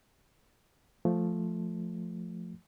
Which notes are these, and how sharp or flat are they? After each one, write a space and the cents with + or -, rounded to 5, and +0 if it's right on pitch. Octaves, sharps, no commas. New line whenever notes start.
F3 +0 A3 +0